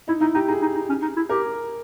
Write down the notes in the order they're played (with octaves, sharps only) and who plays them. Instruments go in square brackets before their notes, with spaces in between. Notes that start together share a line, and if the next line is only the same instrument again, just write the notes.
[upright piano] D#4 [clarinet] E4
[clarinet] D#4 [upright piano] E4
[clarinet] D#4 [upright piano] G4
[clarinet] D#4 [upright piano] G#4
[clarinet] D#4
D#4
C#4
D#4
E4
[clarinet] G4 [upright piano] A#4